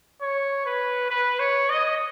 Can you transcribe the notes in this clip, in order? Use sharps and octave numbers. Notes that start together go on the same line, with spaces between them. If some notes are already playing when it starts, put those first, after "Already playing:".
C#5
B4
B4
C#5
D#5